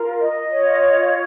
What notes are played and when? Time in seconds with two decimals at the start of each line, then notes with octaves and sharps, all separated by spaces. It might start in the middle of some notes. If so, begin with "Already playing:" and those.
Already playing: F4 A#4
0.19 D#5
0.51 F4 C#5